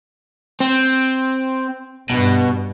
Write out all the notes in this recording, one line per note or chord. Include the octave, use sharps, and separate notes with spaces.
C4
G2 B2